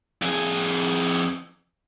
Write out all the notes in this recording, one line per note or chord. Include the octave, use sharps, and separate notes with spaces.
F2 G#4